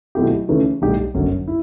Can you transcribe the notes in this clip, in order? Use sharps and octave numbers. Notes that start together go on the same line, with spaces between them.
B2 F#3 A3 E4 G4
C#3 E3 A3 C#4
B1 A2 G3 D4 G4
G1 F#2 D3 F#3 C#4
E4